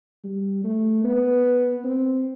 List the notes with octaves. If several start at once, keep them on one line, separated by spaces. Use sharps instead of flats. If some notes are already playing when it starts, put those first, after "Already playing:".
G3
A3
B3
C4